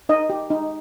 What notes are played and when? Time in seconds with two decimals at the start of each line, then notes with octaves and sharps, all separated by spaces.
0.09 D#4 D#5
0.30 G4
0.50 D#4